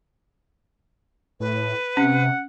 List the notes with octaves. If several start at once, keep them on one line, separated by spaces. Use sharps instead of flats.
A2 B4
C3 C#4 F#5